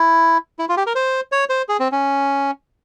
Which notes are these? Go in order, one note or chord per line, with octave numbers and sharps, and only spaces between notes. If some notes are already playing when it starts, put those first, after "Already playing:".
Already playing: E4
E4
F4
G4
A#4
C5
C#5
C5
G#4
C4
C#4